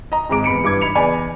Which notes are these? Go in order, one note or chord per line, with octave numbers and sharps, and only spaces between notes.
D#5 A#5
G#1 G#2 G#3 A#5 D6 D7
E2 B5 C#7 D7
G2 E3 D6 G#6
D#4 B5 C#7 F7
E2 D5 G#5 B5